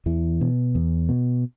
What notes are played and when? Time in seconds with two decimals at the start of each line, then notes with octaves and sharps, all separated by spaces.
0.06 E2 E3
0.41 B2
0.75 E2
1.09 B2